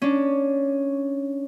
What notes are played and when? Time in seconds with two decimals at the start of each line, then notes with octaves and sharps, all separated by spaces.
0.02 C#4 D4